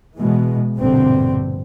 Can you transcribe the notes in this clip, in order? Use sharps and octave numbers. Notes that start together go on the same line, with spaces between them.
B2 E3 G#3
A#1 G2 B2 D3 C4